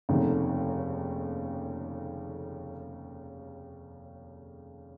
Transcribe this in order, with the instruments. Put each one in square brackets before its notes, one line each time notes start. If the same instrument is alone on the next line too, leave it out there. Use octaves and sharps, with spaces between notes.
[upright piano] F1 D#2 C#3 A3 D#4